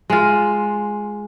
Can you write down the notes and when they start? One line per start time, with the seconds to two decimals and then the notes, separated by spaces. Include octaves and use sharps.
0.10 G#3 F4